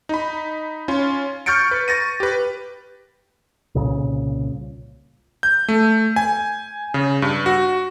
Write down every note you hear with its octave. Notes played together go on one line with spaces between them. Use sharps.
D#4 B5
C#4 F4
C#6 F6 G6 A6 C#7 D7
B4
C#6 A6 A#6 D#7
G4 B4
C2 A#2 C#3
G6
A3
G#5
C#3
G2
F#4